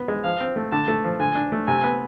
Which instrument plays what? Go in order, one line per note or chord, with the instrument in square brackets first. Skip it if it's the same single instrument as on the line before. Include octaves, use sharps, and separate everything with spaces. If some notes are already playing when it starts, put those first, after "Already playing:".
Already playing: [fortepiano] B3
G#3
[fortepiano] F3 [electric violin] F5
[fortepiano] C4
A3
[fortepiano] D3 [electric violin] A5
[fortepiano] A3
F3
[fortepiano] D3 [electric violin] G#5
[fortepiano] D4
A3
[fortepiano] C3 [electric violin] G#5
[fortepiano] B3